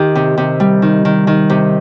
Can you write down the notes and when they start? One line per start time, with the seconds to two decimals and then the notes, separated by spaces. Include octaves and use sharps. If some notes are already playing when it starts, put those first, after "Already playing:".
Already playing: D#3 G4
0.15 C3
0.38 C3
0.60 G3
0.82 D#3
1.05 D#3
1.27 D#3
1.50 C3